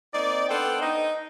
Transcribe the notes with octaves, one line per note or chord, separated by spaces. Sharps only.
A#3 C4 D#4 D5
B3 D4 A4 C5 G5
D#4 D#5